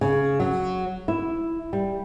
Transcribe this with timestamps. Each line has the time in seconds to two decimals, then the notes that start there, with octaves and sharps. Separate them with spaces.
0.01 C#3
0.40 F#3
1.08 E4
1.73 G3